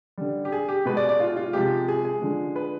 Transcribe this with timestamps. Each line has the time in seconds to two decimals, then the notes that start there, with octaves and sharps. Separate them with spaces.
0.18 D3 G3
0.45 G4
0.52 G#4
0.68 G4
0.85 B2 G#3 B4
0.97 D5
1.09 D5
1.20 F4
1.36 F4
1.53 C3 F3 G#3 G4
1.88 G#4
2.05 G#4
2.22 D3 F3 G#3
2.56 B4